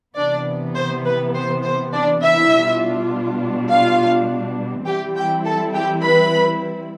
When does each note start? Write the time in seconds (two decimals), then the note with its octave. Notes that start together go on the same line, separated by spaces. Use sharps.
0.17 C3 E3 B3 D4 D5
0.76 C5
1.05 B4
1.35 C5
1.64 C5
1.93 D4 D5
2.23 E4 E5
2.52 B2 G3 D4 F4
3.69 F4 F5
4.86 E3 G3 C4 E4 G4 G5
5.16 G4 G5
5.45 A4 A5
5.74 G4 G5
6.04 B4 B5